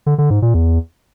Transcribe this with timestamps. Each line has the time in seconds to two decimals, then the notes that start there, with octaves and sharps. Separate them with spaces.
0.06 D3
0.18 D3
0.30 G#2
0.42 A#2
0.54 E2